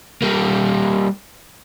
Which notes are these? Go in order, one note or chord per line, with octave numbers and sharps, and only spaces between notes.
G3 A#3